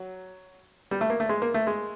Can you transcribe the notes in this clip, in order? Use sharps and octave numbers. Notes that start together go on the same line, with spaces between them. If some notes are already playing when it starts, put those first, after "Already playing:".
Already playing: F#3
G3
A3
A#3
A3
G#3
A#3
A3
G#3